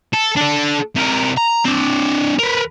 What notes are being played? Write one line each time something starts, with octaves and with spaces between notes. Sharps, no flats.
A4
D4 A4
C3 A#4
A#5
C4 D4
A#4 B4